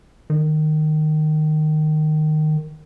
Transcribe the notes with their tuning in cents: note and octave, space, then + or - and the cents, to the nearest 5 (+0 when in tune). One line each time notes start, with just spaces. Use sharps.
D#3 -15